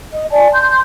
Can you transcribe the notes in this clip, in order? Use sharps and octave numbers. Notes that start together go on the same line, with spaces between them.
D#5
D5 G#5 A5
C6 G6